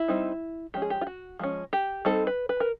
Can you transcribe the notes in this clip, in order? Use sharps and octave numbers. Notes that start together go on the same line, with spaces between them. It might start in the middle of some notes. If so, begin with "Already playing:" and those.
Already playing: E4
G3 C4 D#4
F3 G#3 C#4 G4
G#4
G4
F4
F#4
F3 G#3 C#4
G4
G3 C4 D#4 A4
B4
B4
A#4